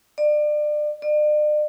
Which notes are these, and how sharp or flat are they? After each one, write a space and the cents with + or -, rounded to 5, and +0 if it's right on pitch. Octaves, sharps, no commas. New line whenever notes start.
D5 +30
D5 +40